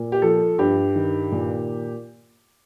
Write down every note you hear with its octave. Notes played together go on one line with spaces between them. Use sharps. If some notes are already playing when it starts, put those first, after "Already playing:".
Already playing: A#2
G4
F3 A4
G2 G4
D#3
A#2